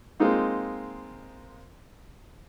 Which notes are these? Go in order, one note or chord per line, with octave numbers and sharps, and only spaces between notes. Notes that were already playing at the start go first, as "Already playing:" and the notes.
G#3 A#3 C4 D#4 F4